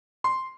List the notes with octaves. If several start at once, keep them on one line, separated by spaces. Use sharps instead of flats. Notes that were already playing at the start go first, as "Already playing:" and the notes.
C6